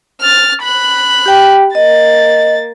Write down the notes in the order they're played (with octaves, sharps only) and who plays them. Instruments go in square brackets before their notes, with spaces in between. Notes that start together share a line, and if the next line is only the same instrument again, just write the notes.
[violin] F6 A6
B5 F#6
[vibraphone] G4 G5
[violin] A#3 A6 [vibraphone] D#5